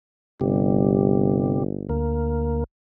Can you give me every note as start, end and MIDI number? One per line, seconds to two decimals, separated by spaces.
0.41 2.05 31
0.41 1.63 48
0.41 1.63 55
1.89 2.64 38
1.89 2.64 58